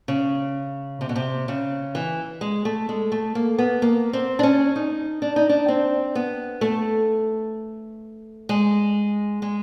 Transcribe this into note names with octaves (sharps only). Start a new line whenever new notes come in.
C#3
C3
B2
C3
C#3
E3
G#3
A3
G#3
A3
A#3
B3
A#3
C4
D4
C#4
D#4
D4
D#4
D4
C4
B3
A3
G#3
G#3